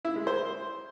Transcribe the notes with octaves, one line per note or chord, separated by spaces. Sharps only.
E4
G#3
C5